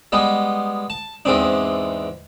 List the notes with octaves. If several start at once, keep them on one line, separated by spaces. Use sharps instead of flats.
G3 G#3 B3
A5
E2 G#2 E3 C4 D4